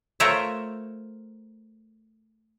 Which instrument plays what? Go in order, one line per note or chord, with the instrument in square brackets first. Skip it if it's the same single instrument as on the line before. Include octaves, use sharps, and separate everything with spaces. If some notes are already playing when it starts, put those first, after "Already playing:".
[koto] A3 F4 A#4 C5 C#5 E5